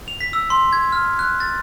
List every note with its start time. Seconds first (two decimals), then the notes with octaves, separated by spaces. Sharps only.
0.08 F7
0.21 B6
0.33 E6
0.50 C6
0.73 G#6
0.92 F6
1.19 F#6
1.40 A6